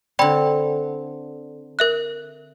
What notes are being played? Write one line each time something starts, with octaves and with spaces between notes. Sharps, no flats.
D3 C4 D5 G5 B5
A#4 E5 F#6